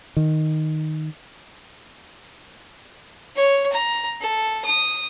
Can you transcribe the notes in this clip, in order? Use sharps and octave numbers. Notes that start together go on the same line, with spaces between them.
D#3
C#5
A#5
A4
D#6